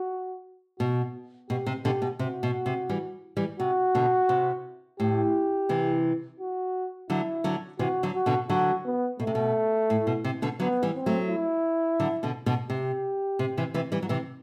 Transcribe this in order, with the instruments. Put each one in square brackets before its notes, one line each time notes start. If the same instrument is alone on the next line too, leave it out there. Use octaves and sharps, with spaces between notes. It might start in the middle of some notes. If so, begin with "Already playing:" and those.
Already playing: [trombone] F#4
[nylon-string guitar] B2 [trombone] F#4
[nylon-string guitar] B2 [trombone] G4
[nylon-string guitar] C3
[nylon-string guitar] B2 D3 [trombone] G4
[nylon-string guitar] B2
[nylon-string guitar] C3 [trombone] F#4
[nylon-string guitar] B2
C3
E3 G3
E3 G3
[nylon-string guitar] C3 [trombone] F#4
[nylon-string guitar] B2 D3
C3
[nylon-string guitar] A2 [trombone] G4
[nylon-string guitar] C3 E3
[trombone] F#4
[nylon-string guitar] D3 F#3 [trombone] E4
[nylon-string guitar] D3 F#3
[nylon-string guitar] C3 E3 [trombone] F#4
[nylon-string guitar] D3 F#3
[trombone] F#4
[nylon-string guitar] B2 D3
[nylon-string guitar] D3 F#3 [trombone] F#4
[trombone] B3
[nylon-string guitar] B2 [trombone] A3
[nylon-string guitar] C3
B2
A2
B2
C3
B2 D3
[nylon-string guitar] D3 F#3 [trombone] B3
[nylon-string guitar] E3 G3
[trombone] C4
[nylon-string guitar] F#3 A3
[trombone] E4
[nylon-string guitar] D3 F#3
B2 D3
B2 D3
[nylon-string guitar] C3 [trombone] G4
[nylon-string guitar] C3
C3 E3
C3 E3
E3 G3
F#3
C3 E3